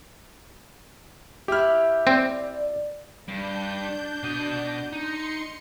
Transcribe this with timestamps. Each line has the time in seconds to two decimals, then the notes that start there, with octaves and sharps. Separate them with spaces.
1.48 E4 G4 E5 F6
2.07 C4 D5
3.28 G2 D4 G6
4.23 B2 D#5
4.92 D#4 C6 C#7